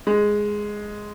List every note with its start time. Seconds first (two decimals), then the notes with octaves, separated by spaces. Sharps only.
0.07 G#3